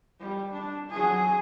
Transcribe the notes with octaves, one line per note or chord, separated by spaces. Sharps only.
G3
D4
F#3 G#4